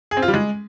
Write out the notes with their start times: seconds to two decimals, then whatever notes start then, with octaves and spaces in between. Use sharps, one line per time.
0.11 G#4
0.17 C4
0.22 F4
0.28 G3
0.34 G#3